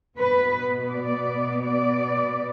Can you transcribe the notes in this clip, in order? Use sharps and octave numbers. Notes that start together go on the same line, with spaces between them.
B2 B3 B4
D5
D5